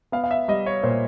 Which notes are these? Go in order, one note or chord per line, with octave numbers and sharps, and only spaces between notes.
B3 F5
F5
E5
G3 D#5
C#5
A#2 C5